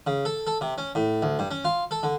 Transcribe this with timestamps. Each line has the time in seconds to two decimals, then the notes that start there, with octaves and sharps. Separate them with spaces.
0.07 C#3
0.25 A4
0.47 A4
0.61 C3
0.78 C#4
0.95 A2
1.22 D2
1.39 G2
1.51 C#4
1.65 F4
1.91 A4
2.03 D3